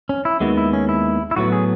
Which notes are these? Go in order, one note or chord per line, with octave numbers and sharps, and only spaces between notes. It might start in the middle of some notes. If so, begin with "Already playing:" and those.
C#4
E4
D#2 D#3 G#3 B3 F#4
E4
C#4
E4
E4
A2 F#3 B3 F#4
G#4